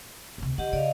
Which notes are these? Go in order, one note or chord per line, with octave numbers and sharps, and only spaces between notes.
D2 C3
D3 G4 D#5 F#5
C#3 D5 D#5 F5